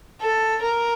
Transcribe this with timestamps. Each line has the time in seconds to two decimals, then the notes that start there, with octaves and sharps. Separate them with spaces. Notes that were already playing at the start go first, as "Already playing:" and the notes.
0.21 A4
0.62 A#4